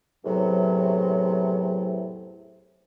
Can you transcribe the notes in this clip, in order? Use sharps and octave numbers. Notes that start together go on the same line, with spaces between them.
E2 A2 C3 F#3